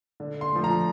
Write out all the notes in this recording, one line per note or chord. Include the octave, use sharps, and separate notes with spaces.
D3
C6
F3 A3
A#5